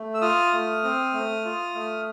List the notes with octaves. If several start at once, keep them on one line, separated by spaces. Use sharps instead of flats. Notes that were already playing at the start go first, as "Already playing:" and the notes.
Already playing: A3
E6
F4 D#6 F6
A3
C4
A3
F4
A3